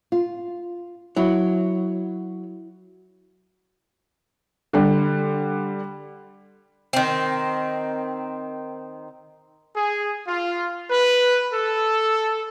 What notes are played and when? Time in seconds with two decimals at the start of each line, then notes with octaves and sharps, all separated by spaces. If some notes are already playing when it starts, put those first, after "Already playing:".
0.12 F4
1.16 F#3 E4
4.73 D3 G3
6.93 D#3 C4
9.76 G#4
10.28 F4
10.91 B4
11.54 A4